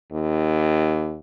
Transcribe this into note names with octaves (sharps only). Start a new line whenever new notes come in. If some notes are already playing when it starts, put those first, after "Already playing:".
D#2